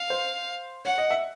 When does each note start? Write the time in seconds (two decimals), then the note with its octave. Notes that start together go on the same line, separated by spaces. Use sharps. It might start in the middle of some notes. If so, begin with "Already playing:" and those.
Already playing: F5
0.10 C5
0.85 C#5 F#5
0.98 D#5
1.11 E5